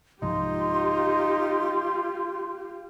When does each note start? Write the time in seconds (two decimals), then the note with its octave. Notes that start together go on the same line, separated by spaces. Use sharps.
0.22 C2 G#2 F3 D#4 F4 G4 C6